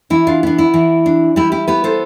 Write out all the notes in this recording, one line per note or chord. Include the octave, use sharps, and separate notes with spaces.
E3 E4
D4 F4
B3 D4
E4
E3
D4
G3 E4 G4
E4 G4
B3 G4 B4
A4 C5